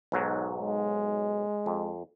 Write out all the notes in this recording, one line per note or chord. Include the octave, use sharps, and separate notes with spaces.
B1 G#2 F#3
G#3
F2